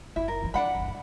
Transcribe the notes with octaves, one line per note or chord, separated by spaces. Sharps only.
F#1 E4
A#4
E3 F3
A#3 D4 F#5 B5
G1 C#2
G#2